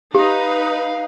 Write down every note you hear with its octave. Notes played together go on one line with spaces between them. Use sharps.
D#4 G4 B4 F5